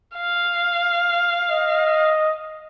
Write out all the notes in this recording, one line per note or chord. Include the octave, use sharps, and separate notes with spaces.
F5
D#5